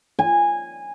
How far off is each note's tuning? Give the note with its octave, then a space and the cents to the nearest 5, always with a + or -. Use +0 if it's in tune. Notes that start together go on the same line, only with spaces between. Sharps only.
G#5 -15